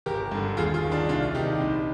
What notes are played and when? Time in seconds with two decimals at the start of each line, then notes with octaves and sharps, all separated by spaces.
0.06 G1 G4 A#4
0.32 G2 D3
0.57 D#2 F4 G#4
0.74 F4 G#4
0.83 D#3
0.91 D4 F4
1.08 C2 D4 F4
1.35 C3 D#3 D#4 G4
1.60 A#1